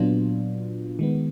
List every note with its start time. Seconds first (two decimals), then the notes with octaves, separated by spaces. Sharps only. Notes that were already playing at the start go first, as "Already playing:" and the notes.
Already playing: A#2 F#3 B3 D4 F4
0.99 D#3 G#3 B3